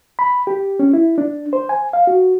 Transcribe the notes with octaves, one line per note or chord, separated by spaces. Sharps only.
B5
G4
C#4
E4
D4
C5
G#5
F5
F#4